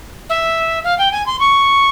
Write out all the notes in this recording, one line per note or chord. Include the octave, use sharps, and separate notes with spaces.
E5
F5
G5
G#5
C6
C#6